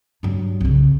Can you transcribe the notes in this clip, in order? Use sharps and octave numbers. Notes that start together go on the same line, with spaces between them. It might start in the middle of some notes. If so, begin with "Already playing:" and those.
G2 F#3
C2 C#3